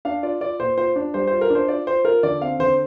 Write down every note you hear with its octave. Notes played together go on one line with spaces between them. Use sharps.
D4 F5
F4 D5
F4 D5
A#2 C5
F4 C5
D4
G3 C5
F4 C5
A#4
D4 C5
F4 D5
F4 C5
F4 A#4
D3 D5
C4 F5
D3 C5